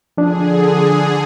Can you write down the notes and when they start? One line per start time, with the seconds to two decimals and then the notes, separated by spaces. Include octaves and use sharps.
0.17 D3 F3 D4 G#4